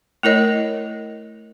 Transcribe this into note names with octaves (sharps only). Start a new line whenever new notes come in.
A3 E4 A#4 C#5 D#5